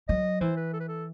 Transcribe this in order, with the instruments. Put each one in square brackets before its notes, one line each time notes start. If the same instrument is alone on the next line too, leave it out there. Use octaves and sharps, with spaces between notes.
[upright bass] F#3 [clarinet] D#5
[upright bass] E3 [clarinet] C5
[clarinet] B4
A4
B4
A4